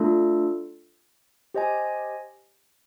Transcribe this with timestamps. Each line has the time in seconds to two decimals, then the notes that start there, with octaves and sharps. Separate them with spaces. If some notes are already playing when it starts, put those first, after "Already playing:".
Already playing: A3 D4 F4 A4
1.54 G4 C5 D#5 G#5